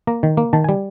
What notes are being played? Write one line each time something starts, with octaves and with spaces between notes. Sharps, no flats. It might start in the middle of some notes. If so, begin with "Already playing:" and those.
A#3 A#5
D#3
A#3
D#3 A5
G3 G#5